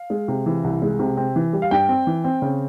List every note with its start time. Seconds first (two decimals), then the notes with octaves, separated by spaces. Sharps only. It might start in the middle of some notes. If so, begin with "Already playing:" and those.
Already playing: F5
0.10 G#3
0.28 C3
0.46 E3
0.64 C2
0.82 G#3
0.99 C3
1.17 C4
1.36 E3
1.53 G3
1.62 F5
1.71 G2 G5
1.89 C4
2.07 E3
2.24 C4
2.42 C#3